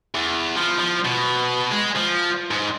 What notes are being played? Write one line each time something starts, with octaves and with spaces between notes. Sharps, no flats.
E2
F3
F3
B2
G#3
F3
G#2